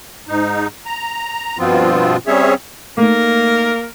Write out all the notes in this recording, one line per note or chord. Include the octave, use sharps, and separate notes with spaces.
G#2 D#4
A#5
G2 B2 F3 B3 C4 F4
G3 C4 C#4 G#4 C#5 E5
A3 A#3 D#4 A#4